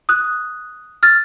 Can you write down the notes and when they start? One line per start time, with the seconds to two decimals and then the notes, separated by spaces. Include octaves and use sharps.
0.09 D#6 F#6
1.03 F6 A6